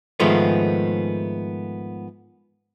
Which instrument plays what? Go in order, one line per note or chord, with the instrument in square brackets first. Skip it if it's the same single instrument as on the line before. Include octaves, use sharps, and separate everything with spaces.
[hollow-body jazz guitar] G#2 D#3 F3 G#3 A3 B3